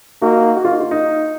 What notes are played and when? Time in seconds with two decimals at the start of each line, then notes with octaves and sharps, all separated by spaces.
0.22 A#3 D#4 F#4
0.57 F#4
0.65 F4
0.72 D#4
0.80 F4
0.91 D#4